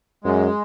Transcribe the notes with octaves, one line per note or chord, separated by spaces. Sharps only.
F#2 G#3